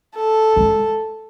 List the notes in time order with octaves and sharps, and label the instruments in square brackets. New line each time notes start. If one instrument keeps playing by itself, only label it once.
[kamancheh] A4
[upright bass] G#3